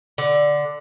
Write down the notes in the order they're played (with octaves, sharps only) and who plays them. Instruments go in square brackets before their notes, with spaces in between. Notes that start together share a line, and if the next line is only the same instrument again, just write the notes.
[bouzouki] D3